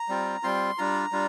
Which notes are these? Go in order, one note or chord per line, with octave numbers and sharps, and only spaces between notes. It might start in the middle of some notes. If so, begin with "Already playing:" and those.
Already playing: A#5
G3 C4 F4
G3 C4 F4 C6
G3 D4 F4 A#5
G3 D4 F4